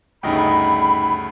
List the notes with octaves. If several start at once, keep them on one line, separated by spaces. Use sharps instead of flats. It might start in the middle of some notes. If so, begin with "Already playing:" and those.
D2 G2 C#3 D#4 D#5 G5 B5